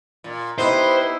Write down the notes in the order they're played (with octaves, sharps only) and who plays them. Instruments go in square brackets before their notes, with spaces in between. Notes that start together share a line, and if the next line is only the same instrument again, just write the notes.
[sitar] A#2
[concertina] B3 G4 B4 [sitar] D#4 [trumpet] E4 [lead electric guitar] C5